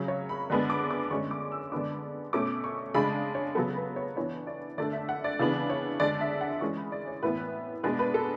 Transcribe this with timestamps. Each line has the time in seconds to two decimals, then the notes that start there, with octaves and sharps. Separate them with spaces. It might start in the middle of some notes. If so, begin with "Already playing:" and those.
Already playing: C#3 F#3 C#4
0.08 C#5
0.29 B5
0.50 D3 G#3 B3 D4
0.70 D6
0.91 D6
1.11 D3 G#3 C#4 C#6
1.31 D6
1.52 E6
1.72 D3 G#3 B3 D4 D6
2.33 B2 A3 C#4 D6
2.64 C#6
2.94 C#3 G#3 D4 B5
3.35 C#5
3.55 C#3 F#3 B3 A4
3.76 B4
3.96 C#5
4.16 E3 B3 D4 C#5
4.47 D5
4.78 D3 A3 D4 D5
4.93 E5
5.09 F#5
5.24 D5
5.39 C#3 E3 B3 D4
5.70 C#5
6.00 D3 G#3 D4 D5
6.21 E5
6.41 F#5
6.61 E3 G#3 C#4 C#6
6.77 B5
6.92 D5
7.08 C#5
7.22 A2 E3 B3 B4
7.83 B2 G#3 B3 D4 B4
7.99 B4
8.14 A4